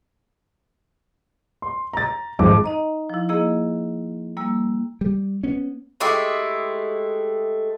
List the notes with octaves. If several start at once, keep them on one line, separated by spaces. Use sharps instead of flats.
C6
A#5 A6
G#1 F2 G#3 D6
D#4 D#5 A#5
F3 E4
A#3 E4 G#4 D#5 E6
G3 A#3 E6
G3
B3 C#4
G#3 A3 E4 G4